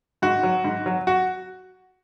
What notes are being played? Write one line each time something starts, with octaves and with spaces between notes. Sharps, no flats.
G#2 F#4
F#3
G#2
F#3
F#4